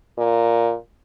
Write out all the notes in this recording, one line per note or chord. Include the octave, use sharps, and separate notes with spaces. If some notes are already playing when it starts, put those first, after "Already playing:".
A#2